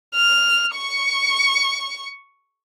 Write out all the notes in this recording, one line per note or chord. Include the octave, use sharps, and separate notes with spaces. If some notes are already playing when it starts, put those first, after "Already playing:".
F6
C#6 C#7